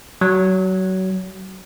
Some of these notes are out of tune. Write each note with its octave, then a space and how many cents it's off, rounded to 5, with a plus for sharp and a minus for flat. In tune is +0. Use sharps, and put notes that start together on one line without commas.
F#3 +25